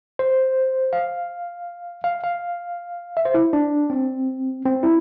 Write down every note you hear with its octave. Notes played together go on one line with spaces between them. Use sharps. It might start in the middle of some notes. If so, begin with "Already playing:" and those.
C5
F5
F5
F5
E5
C5
E4
D4
C4
C4
E4